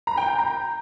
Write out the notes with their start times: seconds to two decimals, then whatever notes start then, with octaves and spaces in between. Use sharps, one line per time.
0.07 A#5
0.18 G5
0.28 G6
0.38 A#5